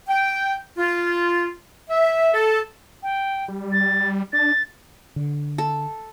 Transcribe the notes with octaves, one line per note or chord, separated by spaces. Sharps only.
G5
F4
E5
A4
G5
G3
A6
D4 A6
D3
A4